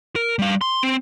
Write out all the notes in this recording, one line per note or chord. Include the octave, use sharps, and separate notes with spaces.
A#4
G3 F5
C6
C4